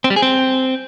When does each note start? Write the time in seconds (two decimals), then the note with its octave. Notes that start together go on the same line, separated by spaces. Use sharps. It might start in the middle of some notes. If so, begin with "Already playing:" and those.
0.04 C4
0.10 G3
0.16 G#4
0.22 C4